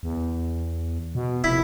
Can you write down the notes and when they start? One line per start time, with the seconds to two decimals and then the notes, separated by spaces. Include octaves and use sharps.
0.03 E2
1.15 B2
1.44 F1 E4